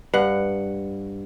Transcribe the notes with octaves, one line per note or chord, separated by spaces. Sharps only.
G2 F#5